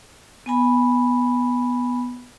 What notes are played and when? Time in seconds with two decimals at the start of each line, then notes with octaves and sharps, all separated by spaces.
0.46 B3 G#5 B5